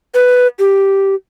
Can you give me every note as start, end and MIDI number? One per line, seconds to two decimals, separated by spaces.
0.14 0.47 71
0.59 1.15 67